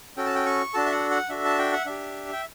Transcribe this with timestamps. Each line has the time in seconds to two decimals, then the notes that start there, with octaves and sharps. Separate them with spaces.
0.17 C#4 F#4 A4 G5
0.26 A5
0.35 G5
0.46 C#6
0.74 D4 F#4 A4 A5
0.86 E5
0.92 F#5
1.11 F#5
1.30 D4 F#4 A4 E5
1.45 A5
1.58 G5
1.73 F#5
1.86 D4 G4 E5
2.33 G5